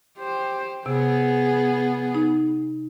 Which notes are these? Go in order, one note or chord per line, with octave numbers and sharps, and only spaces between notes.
G4 C5
C3 B3 G#4
D#4